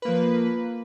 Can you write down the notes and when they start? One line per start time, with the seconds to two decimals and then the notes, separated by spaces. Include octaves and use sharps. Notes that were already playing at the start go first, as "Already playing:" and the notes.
0.02 B4
0.05 A#3
0.08 F3